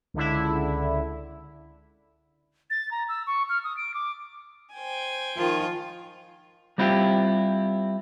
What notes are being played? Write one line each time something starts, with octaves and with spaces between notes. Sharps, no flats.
C#2 D3 E4
A6
A#5
E6
C#6
F6
D#6
D7
D6
C5 G5 G#5
D#3 F3 F4
G3 C4 E4 F4 G4